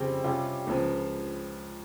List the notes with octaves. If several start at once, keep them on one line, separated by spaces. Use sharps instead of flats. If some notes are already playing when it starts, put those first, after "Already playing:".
Already playing: F2 C#3 G3 C4
C3 G3 C#4 F4
C#2 C#3 F3